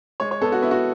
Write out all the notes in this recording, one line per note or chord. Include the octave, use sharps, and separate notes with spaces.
G#3 C#5
C#5
B3 A4
F#4
B3 E4
F#4